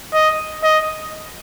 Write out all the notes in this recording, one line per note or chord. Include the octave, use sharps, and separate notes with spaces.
D#5
D#5